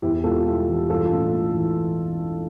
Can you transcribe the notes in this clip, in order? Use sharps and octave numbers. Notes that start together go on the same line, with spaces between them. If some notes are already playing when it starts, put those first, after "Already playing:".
E2 E4 G4
E1 F4 A4
G3 E4 G4
E3
G2 F4 A4
A1
A3
E3